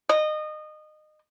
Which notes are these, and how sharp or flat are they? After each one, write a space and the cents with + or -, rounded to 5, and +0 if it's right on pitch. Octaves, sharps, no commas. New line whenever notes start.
D#5 -25